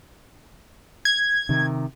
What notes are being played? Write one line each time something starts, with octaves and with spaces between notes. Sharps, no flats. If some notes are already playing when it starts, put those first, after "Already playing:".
G#6
C3 D#3